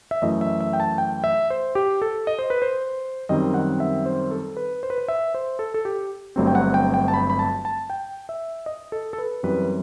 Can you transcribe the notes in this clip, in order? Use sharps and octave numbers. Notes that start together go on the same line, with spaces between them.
E5
F#2 E3 A3 D#5
E5
E5
G5
A5
G5
E5
C5
G4
A4
D#5
C5
B4
C5
F#2 D#3 G3 C4 D#5
F#5
E5
C5
A4
B4
C5
B4
C5
E5
C5
A4
A4
G4
G1 G2 F#3 A3 C4
G5
F#5
G5
G5
A5
B5
B5
A5
A5
G5
E5
D#5
A4
A4
B4
F#2 E3 G3 C4 B4